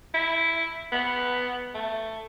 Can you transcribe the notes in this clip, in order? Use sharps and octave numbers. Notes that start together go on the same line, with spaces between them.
E4
B3
A3